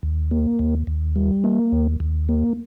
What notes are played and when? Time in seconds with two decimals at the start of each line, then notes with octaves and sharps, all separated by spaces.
0.03 D#2
0.31 A#3
0.59 D#2
0.87 D#2
1.16 G3
1.44 A#3
1.72 D#2
2.00 D#2
2.29 A#3